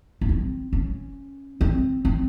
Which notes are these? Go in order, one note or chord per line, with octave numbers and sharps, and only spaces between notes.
B3
C4
C#4
C4
C4